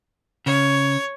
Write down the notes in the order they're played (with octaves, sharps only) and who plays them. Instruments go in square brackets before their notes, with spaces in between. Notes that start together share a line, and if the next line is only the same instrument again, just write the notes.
[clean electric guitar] C#3 [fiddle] C#5